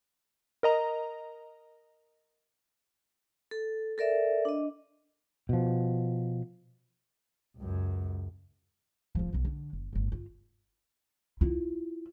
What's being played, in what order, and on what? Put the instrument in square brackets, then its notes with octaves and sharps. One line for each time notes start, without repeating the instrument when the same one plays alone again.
[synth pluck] A#4 D#5 A#5
[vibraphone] A4
A4 A#4 D5 E5
D4 D#5
[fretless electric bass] B2 F3
[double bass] C#2 F#2
[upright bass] D1 F3
B1 B3
D3
F#1
G1 A2
F4
E4 F4